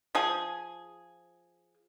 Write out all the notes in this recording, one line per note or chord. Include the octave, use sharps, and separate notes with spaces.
F3 G#4